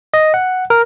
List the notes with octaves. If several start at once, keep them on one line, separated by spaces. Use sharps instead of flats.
D#5
F#5
A#4